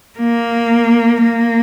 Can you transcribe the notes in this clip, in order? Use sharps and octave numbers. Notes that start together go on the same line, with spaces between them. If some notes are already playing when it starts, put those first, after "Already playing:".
A#3
A#3